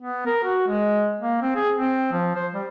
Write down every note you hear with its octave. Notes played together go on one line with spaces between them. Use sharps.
B3
A#4
F#4
G#3
A#3
C4
G#4
C4
F3
C5
G3